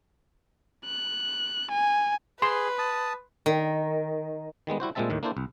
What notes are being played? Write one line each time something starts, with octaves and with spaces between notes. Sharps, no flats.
F#6
G#5
G#4 B4 C6
A5 D#6
D#3
D#3 G3 G#3 B3
G3 E4 F#4 C5
A#2 G3 G#3 C4 E5 A5
D#2 A2 D#3
A#3 D4 E4 A4 C5
C2